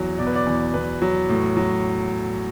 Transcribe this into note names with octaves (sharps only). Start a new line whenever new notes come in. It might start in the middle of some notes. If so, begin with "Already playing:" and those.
Already playing: E2 F#3
B2 D5
B4
D5
E2
E2 B4
F#3
A2
F#3